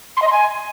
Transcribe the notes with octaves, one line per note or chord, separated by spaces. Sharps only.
C6
D#5
C6
G#5